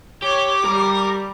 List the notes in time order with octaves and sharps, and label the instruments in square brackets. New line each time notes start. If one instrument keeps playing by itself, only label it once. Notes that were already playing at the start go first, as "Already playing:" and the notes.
[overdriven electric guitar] G4 [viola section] C#5 [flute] D6
[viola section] G3 [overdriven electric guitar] A#4